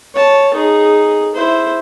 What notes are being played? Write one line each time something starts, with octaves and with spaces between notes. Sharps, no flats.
C#5 A5
D#4 G#4
E4 C5